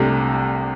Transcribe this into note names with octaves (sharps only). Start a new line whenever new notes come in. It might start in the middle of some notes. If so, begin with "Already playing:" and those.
Already playing: C2 C3 A3 D4